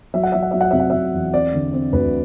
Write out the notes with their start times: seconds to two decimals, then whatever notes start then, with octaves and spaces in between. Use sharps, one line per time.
0.14 F#3 E5
0.23 F#5
0.32 F#3 E5
0.43 F#5
0.51 F#3 E5
0.61 F#5
0.71 C3 E5
0.80 F#5
0.90 C3 E5
1.13 E2
1.33 C4 D5
1.54 D3
1.73 C4
1.93 D2 B4